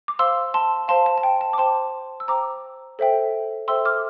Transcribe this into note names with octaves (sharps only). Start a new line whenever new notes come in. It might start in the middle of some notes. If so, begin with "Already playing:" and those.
D6
C5 F5 C6 E6
A5 C6
C5 F5 A5 C6
A5
A5
G5
A5
D6
C5 G5 A5 C6
E6
C5 G5 A#5 D6
A4 C5 E5 G5
A4 C5 E5 G5 C6 E6
D6 F6